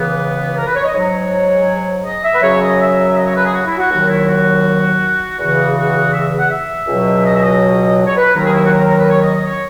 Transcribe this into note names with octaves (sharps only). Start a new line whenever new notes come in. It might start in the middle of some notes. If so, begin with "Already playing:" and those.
Already playing: C#2 C#3 E3 B3
A#4
B4
C#5
D#5
G#2 F#3 C#5
D#5
E5
B4
F#2 C#3 F#3 C#5
D#5
E5
D#5
C#5
B4
G#4
F#4
E4
F#4
D#2 D#3 F#3 F#4
E4
F#4
E2 C#3 E3 F#4
F#4
E5
F#5
E5
C#2 B2 F#3
D#5
E5
D#5
C#5
B4
D#2 D#3 F#3 A#4
G#4
E4
F#4
A#4
A#4
B4
C#5
D#5
D#5
C#5